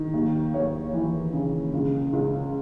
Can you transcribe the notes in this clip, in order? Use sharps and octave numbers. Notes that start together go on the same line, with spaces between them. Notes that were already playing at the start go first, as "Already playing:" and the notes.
Already playing: D#3
D#2
D#2 C#5
E3
C#3
C#2
C#2